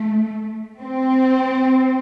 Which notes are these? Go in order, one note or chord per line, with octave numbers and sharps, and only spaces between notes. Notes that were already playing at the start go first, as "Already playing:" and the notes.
Already playing: A3
C4